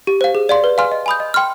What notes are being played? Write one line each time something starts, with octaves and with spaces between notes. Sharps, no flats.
G4
C5 F5
G#4
D5 F5 C6
B4
F5 G#5 C6 F6
D#5
G#5 B5 D#6 G6
D#5
G5 C6 F6